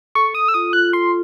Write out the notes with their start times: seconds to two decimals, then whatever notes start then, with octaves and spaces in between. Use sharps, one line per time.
0.15 A4 C#6
0.34 A4 D#6
0.48 E6
0.54 F4 D#6
0.73 F4 F#6
0.93 A4 C6